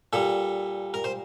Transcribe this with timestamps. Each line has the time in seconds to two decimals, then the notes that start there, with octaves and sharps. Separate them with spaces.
0.13 A#2 G3 A4
0.94 A#4
1.04 C5